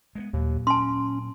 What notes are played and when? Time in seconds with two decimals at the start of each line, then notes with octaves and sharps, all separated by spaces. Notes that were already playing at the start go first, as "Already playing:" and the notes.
0.15 G#3 A3 B3
0.33 D#2 A#2 F#3
0.67 C#4 A5 C6